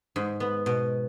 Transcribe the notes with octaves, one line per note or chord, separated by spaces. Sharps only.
G#2
B3
B2